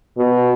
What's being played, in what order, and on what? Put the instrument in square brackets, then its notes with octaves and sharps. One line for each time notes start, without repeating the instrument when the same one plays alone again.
[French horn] B2